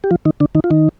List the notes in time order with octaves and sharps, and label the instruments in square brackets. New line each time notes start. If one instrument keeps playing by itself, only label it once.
[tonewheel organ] G4
F3 F4
D#3 D#4
D3 D4
D#3 D#4
F4
D#3 D#4